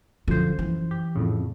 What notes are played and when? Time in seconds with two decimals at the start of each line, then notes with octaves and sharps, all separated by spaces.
0.28 F#2 D3 F3 C5
0.59 E3
0.91 G4
1.15 F2 A2 C#3